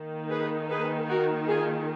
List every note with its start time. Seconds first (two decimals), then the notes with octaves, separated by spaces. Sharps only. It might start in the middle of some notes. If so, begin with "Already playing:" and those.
Already playing: D#3 A#3 D#4
0.30 G#4 B4
0.69 G#4 B4
1.09 F#4 A#4
1.47 F4 G#4